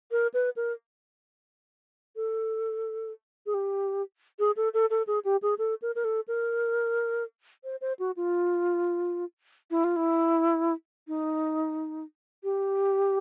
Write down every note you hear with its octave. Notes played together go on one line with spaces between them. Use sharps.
A#4
B4
A#4
A4
G#4
G4
G#4
A4
A4
A4
G#4
G4
G#4
A4
A#4
A#4
A4
A#4
C5
C5
F#4
F4
E4
F4
E4
D#4
G4